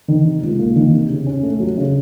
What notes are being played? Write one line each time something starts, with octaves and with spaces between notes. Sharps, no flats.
D#3
C3
C#2
A#3
D#3
C3
C#3
C#4
A3
F#3
C#3